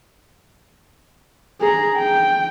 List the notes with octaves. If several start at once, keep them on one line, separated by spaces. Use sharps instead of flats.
G#4 A#5
G5